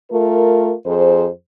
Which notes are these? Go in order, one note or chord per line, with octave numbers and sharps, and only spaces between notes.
A3 F4 A#4
F2 G#4 C5